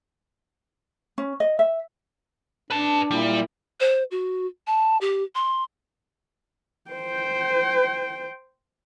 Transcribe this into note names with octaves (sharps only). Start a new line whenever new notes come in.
C#4
D#5
E5
D4 B4 A5
A#2 G3 E4
C5
F#4
A5
G4
C6
C5 G5